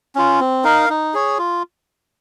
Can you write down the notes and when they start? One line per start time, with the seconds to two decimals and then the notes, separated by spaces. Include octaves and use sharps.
0.15 C#4 F4
0.40 C4
0.64 D#4 A#4 F5
0.90 D#4
1.14 G#4 C#5
1.38 F4